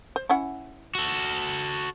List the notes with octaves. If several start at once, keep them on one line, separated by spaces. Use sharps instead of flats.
C5
C#4 E4 F#5
F#4 A4